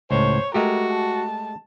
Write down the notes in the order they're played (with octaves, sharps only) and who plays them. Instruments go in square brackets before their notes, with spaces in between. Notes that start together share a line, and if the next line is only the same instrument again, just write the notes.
[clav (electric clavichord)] C#2 A2 [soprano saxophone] C5 [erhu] C#5
[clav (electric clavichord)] G#3 A3 G4 [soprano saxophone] F#4 [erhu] A#4
[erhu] A5